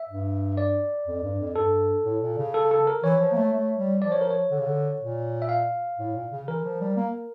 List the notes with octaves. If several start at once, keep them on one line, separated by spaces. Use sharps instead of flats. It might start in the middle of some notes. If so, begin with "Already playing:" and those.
Already playing: E5
G2
D5
F2
G2
F2
G2 A4
A2
A#2
C#3
A4
A4
A#4
E3 C#5
F3
A#3
A3
A3
G3
F3 D5
C#5
A#4
C#5
D3
C#3
D3
A#2
E5
F5
A2
A#2
C#3
E3 A#4
F3
G3
A#3